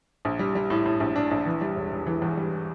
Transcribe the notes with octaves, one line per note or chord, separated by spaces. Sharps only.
A#1
G3
G3
A2
A2
A#1
D4
A#1
E3
G3
E1
E1
E3
E2
G3